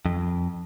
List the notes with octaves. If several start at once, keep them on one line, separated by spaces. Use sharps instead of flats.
F2